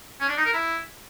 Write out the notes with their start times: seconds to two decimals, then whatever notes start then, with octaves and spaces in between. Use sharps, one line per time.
0.21 C#4
0.29 D4
0.37 D#4
0.45 A#4
0.53 E4